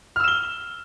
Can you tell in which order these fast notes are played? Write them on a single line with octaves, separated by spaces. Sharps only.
F6 E6 E7 G7